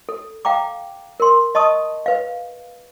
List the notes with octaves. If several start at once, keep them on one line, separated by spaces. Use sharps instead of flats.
A4
F5 G5 A#5 D6
A#4 C6
D#5 A5 C#6 D#6
B4 F5